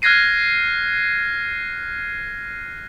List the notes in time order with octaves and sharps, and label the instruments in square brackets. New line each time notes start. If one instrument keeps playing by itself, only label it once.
[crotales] F6 F#6 G#6 A#6 C7 D#7